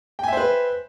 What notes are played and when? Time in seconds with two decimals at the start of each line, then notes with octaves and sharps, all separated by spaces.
0.19 G5
0.23 G#5
0.28 E5
0.33 C5
0.37 B4